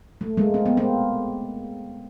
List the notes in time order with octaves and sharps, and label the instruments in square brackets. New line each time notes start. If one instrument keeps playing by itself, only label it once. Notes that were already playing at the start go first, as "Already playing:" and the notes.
[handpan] A3
G#3 A#3
C4
B3
A#3 C4